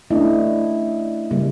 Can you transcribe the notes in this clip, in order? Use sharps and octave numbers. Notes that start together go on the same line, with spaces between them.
A3 C#4 D4 E4 D#5
C#3 G3 A#3